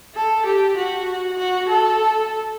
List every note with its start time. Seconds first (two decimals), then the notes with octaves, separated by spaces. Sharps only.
0.15 A4
0.46 G4
0.77 F#4
1.38 F#4
1.69 A4